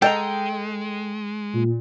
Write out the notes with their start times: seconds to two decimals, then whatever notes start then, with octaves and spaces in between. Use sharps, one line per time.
0.02 G#3 A4 D#5 G5 A#5
1.53 A#2